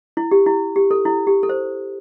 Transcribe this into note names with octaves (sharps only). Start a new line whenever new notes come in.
E4
G4
E4
G4
A4
E4
G4
A4
C5